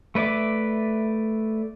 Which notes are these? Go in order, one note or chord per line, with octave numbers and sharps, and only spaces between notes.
A3 B4 D5 E5 D6